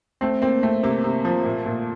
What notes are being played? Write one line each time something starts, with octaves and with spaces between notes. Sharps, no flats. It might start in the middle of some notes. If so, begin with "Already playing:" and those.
A3 C4
A#3 C4
A3 C4
C3 A#3
C3
F3
A#2
A#2